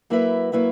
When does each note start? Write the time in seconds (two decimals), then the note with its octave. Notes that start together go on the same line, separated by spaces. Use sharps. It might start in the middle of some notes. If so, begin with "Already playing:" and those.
0.10 F#3 A#3 E4 B4 E5
0.52 F#3 A#3 E4 B4 E5